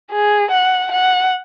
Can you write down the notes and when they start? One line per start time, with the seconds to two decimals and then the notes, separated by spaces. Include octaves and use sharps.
0.12 G#4
0.51 F#5
0.91 F#5